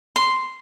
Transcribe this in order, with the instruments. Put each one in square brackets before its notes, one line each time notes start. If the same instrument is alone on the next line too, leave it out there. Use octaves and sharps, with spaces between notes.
[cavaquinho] C6